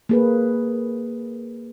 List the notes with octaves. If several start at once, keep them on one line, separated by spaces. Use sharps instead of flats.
A#3 G#4 B4